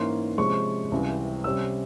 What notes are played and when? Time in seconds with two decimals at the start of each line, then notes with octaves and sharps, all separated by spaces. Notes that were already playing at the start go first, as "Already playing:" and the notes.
Already playing: G#2 E3 A#3 C#4 C6
0.38 C3 F3 G#3 C#4 C#6
0.91 C#2 C3 E3 G3 C4
1.44 C3 G3 C#4 E6